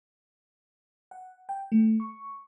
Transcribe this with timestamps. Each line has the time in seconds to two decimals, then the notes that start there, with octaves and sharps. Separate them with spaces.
1.11 F#5
1.49 G5
1.72 A3
2.00 C#6